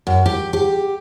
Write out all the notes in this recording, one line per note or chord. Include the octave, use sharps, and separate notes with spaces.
F#2
G4
G4